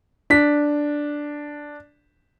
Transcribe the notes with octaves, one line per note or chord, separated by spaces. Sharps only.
D4 B6